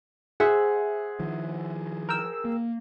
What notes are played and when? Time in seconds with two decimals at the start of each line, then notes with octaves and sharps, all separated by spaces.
0.40 G#4 C5 E5 F#5
1.20 D#3 F3
2.09 A#4 G5 E6
2.45 A#3